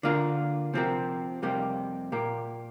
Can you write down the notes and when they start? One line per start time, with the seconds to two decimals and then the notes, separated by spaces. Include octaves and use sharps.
0.03 D3 A#3 F4 A#4
0.74 C3 F3 C4 G4 A#4
1.42 F2 C3 G3 A#3 G4
2.12 A#2 A#3 G4 A#4